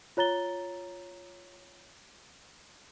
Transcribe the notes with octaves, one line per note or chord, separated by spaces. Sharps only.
F4 C#5 A#5 A6 G7